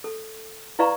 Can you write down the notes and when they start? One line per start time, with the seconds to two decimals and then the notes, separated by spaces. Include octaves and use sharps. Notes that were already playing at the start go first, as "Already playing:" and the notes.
0.04 A4
0.79 E4 B4 D5 F5 A#5 C#6